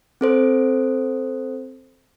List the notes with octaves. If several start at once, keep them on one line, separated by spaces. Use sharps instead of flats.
C4 A4 C5